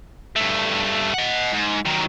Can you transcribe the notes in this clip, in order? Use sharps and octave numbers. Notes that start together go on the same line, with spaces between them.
G2 A3
D#5 F#5
G#2
D#3 F#3